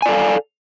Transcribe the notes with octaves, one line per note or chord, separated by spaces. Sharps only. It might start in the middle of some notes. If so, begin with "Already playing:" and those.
A4 D5 F5 G#5